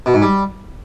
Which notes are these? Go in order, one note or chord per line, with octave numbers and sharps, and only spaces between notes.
B2
G#2
G3